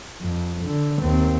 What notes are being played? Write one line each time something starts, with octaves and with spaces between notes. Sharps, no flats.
F2
D3
D#2 C4